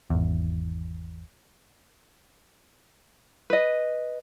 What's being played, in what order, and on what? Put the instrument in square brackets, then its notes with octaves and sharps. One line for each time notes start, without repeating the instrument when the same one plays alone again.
[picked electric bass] G#1 E2
[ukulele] B4 D#5